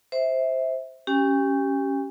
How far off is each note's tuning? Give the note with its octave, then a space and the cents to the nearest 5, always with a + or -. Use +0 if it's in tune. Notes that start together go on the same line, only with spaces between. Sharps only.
C5 +0 E5 -15
C#4 +0 G4 -20 G#5 -45